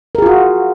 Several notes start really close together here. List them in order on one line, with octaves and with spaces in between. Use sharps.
A#4 G#4 F4 F#4